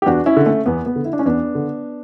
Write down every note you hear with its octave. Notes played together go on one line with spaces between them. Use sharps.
G4
E2 D4 F#4
C#4 E4
D3
A3 C#4
E2 B3
B3
D3
E4
D4
C#4
E2 B3 D4
D3